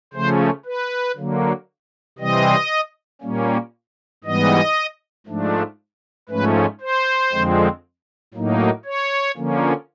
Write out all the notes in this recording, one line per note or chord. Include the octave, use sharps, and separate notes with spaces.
C#3 F3 A3 C#4 C5
B4
D3 F#3 A#3
C3 E3 G3 C4 D#5
A#2 G3 A#3 C#4
G#2 E3 G3 B3 D#5
G#2 F3 A3 D4
G#2 F3 A3 C#4 B4
C5
F2 D3 F3 G#3 C4
A2 F#3 A#3 D#4
C#5
D3 F3 A#3 C#4